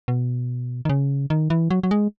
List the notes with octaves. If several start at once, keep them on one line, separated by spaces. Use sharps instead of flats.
B2
D#3
C#3
D#3
E3
F#3
F#3
G#3